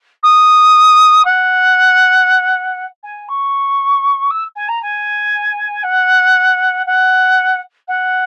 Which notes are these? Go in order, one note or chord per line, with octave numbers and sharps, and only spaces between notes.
D#6
F#5
G#5
C#6
E6
G#5
A#5
G#5
F#5
F#5
F#5